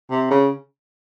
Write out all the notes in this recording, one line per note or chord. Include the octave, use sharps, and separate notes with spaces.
C3
C#3